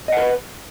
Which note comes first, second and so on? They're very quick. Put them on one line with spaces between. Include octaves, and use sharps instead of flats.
D#5 F#5 A#4 B4